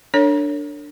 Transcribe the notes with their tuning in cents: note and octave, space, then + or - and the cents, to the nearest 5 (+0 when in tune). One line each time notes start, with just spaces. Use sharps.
D4 +0 A#4 -45 C#5 +0